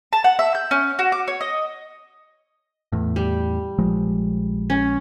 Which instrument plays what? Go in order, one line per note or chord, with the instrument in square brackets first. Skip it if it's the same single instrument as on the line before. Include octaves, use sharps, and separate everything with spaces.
[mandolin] A5
F#5
E5
G6
C#4
F#4
D6
C#5
D#5
[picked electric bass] E2 A2
[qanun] G3
[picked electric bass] A#1 F3 G#3
[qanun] C#4